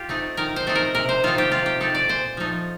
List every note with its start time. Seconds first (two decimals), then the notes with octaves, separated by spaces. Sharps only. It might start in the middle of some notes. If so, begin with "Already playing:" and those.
Already playing: F4 G4
0.09 A3 C4 D#4
0.37 D#3 A#4
0.56 C5
0.67 A3 C4 D#4
0.75 A#4
0.95 C3 A#4
1.09 C5
1.23 D#3 A3 C4 D#4 F4
1.38 G4
1.52 C3 F4
1.66 G4
1.80 D#3 A3 C4 D#4 A4
1.95 D5
2.09 A#2 C5
2.37 F3 A3 D#4